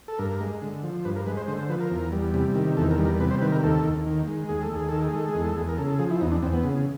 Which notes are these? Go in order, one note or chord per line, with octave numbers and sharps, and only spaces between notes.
A4
G2 A#4
G#3
D3
F3
G2 B4
A#4
G#3 B4
C5
D3 C5
C5
F3 B4
A#4
E2
G3
C3
D#3
E2 A4
A#4
G3
A#4
C3 B4
C5
D#3 B4
A#4
D#2 A4
D#2
D#3
G#3
D#2 G#4
A4
D#2
G#4
D#3 A4
G#4
G#3 A4
G#4
E2
A4
E2 G#4
A#4
C#3 A4
A4
F3 G#4
E4
E2 D#4
D4
E2 C4
B3
C#3